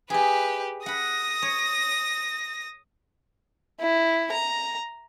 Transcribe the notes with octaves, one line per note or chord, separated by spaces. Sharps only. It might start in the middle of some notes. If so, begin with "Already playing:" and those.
G4 G#4 B4 D#5
F#5 B5 D#6 A#6
C#5
E4
A#5